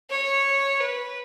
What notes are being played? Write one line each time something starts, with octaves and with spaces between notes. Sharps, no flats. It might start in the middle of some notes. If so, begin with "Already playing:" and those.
C#5
B4